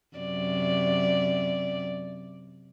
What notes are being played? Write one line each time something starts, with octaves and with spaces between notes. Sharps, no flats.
F#2 C3 D5